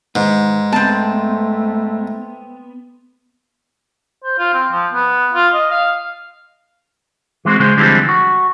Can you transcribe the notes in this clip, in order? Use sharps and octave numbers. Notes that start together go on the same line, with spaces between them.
G#2 D#3 B4
A3 B3 C4 A5
C5
F4
C4
F3
B3
F4
D#5
F5
E3 G#3 C4 F#4
C#3 G#3 C5
D3 E3 F3 G3 G#3 C4
F#4